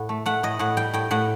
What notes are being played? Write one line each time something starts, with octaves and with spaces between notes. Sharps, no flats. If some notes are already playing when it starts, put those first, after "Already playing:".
Already playing: A2 F#5
A3
A3 F#5
A2 D#5
A2 F#5
G3 G5
A2 G5
A2 F#5